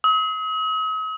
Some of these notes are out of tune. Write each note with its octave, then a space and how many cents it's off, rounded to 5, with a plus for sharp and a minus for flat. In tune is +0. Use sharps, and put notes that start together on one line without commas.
D#6 +45